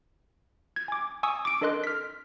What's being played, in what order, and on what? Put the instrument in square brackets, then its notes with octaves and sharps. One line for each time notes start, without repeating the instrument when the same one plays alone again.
[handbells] G#6
G#5 D6
G#5 C#6 D#6 E6
D6 D7
D4 A4 A#4 D#5 C6 F#6
F6 B6